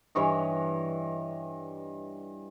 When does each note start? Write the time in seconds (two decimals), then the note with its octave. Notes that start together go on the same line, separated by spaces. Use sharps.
0.15 G2 E3 C#5 D#5